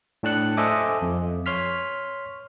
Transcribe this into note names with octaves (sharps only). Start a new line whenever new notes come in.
A2 D4 A5 F#6 C#7
A4 C5 D#5 E5 G#5 D6
F2
C#5 C6 F6 B6